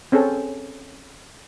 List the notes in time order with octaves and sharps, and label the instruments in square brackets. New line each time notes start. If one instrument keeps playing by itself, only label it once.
[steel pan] C4 C#4 G#4 A4